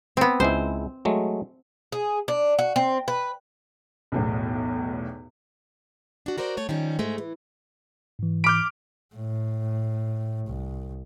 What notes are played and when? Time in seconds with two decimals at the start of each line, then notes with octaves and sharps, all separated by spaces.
0.17 B3 C4
0.40 C#2 G#3 E4 C5
1.05 F#3 G#3 A3
1.92 G#4
2.28 D4
2.59 F#4
2.76 C4
3.08 B4
4.12 B1 E2 A2
6.26 D4 F#4
6.38 F#4 A#4 C5 D5
6.57 A3 C#5
6.69 D#3 F3 G3 C#4
6.99 G#2 G#3 A3
7.18 E3
8.19 G#2 E3
8.44 B5 D6 F6 G6 D7
9.15 A2
10.47 C2